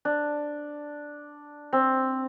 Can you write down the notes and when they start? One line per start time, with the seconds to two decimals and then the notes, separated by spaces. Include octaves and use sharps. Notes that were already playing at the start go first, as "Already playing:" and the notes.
0.05 D4
1.73 C4